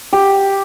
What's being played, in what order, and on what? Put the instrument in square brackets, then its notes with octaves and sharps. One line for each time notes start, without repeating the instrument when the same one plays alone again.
[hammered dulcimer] G4